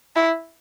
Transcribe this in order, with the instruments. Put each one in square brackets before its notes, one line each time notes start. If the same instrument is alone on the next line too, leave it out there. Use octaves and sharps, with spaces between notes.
[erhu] E4